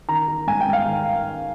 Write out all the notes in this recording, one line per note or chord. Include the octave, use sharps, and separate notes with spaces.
D#3 A#5
D#3
G#2 G#5
G5
G#2
F5
D#3